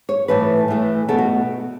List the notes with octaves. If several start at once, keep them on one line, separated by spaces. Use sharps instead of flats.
C#5
A2 E3 A3 B4
A2 E3 A3
B2 A3 A4
F#4